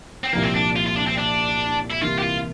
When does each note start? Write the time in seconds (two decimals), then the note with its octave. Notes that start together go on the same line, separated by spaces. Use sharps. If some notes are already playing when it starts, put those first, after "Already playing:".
0.24 C4
0.33 C2 A#2 F3 A#3
0.43 C4
0.54 D4
0.76 F4
0.86 F4
0.96 D4
1.07 C4
1.18 D4
1.90 E4
2.01 C2 C3 E3 A#3 E4 F4
2.19 G4
2.22 F4